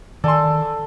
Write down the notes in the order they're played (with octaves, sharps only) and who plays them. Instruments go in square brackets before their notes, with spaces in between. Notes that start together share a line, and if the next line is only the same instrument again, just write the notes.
[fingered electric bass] D#3 [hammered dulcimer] A4 [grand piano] D5 G#5 C6